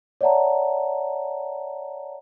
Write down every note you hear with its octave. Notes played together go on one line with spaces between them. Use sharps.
C#5 D5 E5 F#5 A5 A#5